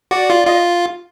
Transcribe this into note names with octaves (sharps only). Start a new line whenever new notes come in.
F#4 D5
F4
F4 D#5